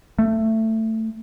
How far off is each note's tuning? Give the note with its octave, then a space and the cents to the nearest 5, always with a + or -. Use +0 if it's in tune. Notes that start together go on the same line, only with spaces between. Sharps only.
A3 +15